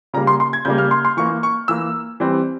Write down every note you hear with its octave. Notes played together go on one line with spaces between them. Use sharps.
C#3 G3 A#3 A#5
C6
C6
G#6
C#3 G3 A#3 G6
F6
C6
C6
E3 A#3 C#6
C#6
E3 A#3 E6
E3 G3 C4